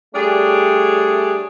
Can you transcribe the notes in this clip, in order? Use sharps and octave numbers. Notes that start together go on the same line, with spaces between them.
G3 A3 D4 G#4 C#5